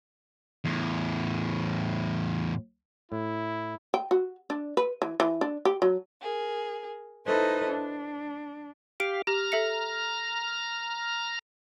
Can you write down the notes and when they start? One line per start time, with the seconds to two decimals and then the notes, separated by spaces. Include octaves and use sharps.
0.65 E2 A2
3.12 A2 E4
3.94 G5
4.11 F#4
4.50 D4
4.77 B4
5.02 E3
5.20 E3
5.41 D4
5.65 G4
5.82 F#3
6.21 G#4 A#4
7.26 D#4 E4 A4 B4 C5 D#5
7.68 D4
9.00 G4 F5 D7
9.27 G4 A#5 F6
9.52 A4 E5 C#7